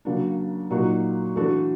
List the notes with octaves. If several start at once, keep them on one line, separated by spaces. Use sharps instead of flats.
C#3 F#3 A#3 D4
A#2 F#3 A#3 D#4 F#4
E3 A3 D4 F#4 A4